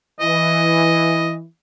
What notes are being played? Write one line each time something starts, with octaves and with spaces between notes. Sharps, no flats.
E3 D#5